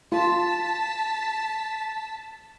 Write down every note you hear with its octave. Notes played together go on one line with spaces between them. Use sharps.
F4 A5 B6